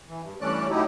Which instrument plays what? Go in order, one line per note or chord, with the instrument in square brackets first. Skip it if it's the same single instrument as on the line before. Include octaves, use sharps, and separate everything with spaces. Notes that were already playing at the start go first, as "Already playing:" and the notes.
[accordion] E3
G2
G2 E3 A3 C#4 D5 F#6
A2 F#3 A3 D#4 E4 G4